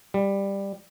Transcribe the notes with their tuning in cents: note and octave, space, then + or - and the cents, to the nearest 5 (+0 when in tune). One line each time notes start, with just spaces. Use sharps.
G3 +10